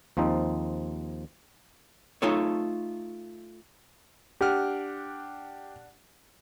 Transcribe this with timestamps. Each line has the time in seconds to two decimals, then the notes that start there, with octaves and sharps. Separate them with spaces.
0.17 D#2 F3 C4 D#4
2.22 A3 D#4 F4 A4 C#5
4.41 D4 G4 F#5 F6